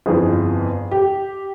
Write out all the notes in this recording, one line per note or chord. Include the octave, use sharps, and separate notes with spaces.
G1 F2 E3 G#4
G4